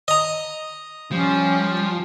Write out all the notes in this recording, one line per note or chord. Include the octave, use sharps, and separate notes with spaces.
D#5 A#5
F3 G3 C#4